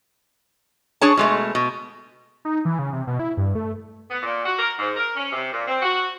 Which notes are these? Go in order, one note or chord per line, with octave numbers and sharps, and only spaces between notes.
D4 G#4 C#5 A5
B2 G#3 A3
B2
D#4
E3
C#3
C3
B2
E4
G2
A3
B3
A#2
F#4
A#4
G#2
A#4
C#4
C3
A#2
C4
F#4